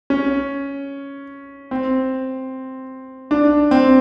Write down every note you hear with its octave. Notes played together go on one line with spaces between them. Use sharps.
C#4
C4
D4
C4